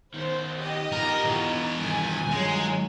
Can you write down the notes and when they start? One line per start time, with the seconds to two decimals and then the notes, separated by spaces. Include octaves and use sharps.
0.14 D#3 B3 C5
0.60 G4 D#5
0.92 B3 D#4 F4 A#4
1.24 B2 E3
1.79 G2 D#3 G#5
2.31 F#3 G#3